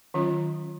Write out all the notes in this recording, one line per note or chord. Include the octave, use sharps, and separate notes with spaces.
D#3 F#3 C#4 F4